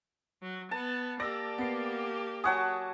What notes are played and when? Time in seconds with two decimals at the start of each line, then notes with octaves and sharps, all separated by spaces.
0.42 F#3
0.71 B3 A5
1.20 A#3 G4 D5 E6 A#6
1.58 B3 C7
2.44 F#3 F#5 G#5 A5 C#6 D#6